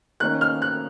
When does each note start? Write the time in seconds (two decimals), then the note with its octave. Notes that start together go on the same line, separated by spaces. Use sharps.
0.20 D#3 A#3 C#4 F#6
0.41 F6
0.62 F#6